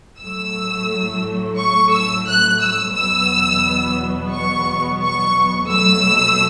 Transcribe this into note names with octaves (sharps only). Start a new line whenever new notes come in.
A2 F#3 A3 E6
C#6
E6
F#6
E6
E2 B2 F#3 B3 E6
C#6
C#6
B2 F#3 A3 E6